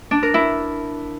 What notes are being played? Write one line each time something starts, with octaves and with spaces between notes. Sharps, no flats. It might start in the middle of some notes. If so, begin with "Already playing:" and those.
D4
A#4
E4